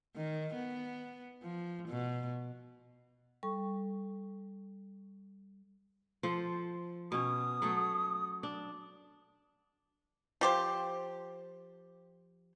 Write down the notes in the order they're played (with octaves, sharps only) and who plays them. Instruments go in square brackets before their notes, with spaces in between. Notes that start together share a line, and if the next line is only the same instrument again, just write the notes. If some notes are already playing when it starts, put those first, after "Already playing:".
[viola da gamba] D#3
B3
F3
B2
[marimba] G3 A4 C#6
[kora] F3 A4 C5
[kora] B2 C#4 [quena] D#6
[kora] F#3 A3 A4
D4
[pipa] F3 G4 C5